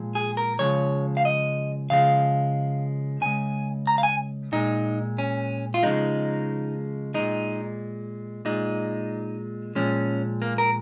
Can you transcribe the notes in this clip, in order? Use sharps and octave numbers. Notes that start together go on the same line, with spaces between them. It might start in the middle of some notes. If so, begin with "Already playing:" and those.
Already playing: A#2 F3 G#3
G#4
A#4
C#3 F3 G#3 C#5
F5
D#5
C#3 F3 G#3 F5
C#3 G#3 G#5
A#5
F5
G#5
A#2 G#3 D#4
C#4
F4
C#3 F3 G#3 D#4
A#2 G#3 D#4
A#2 G#3 D#4
A#2 F3 G#3 C#4
A#3
A#4